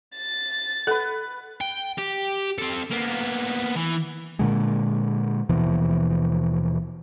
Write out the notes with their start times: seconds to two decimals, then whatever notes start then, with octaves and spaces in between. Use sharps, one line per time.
0.18 A6
0.87 A4 B4 F#5
1.61 G5
1.98 G4
2.58 C4 A4
2.91 A#3 B3
3.76 E3
4.39 A#2 D3 G#3
5.49 D#2 B2 E3 F3